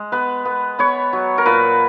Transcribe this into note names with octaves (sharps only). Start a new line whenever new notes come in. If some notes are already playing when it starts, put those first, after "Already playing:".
Already playing: G#3
B3 B4
B3
B3 C#5
F#3
A#4
A#2 B4